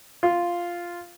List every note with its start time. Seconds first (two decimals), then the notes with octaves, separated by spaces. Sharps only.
0.23 F4